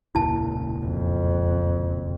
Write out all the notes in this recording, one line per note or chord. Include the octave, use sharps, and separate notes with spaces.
E1 C#2 A#2 E4 A5
F2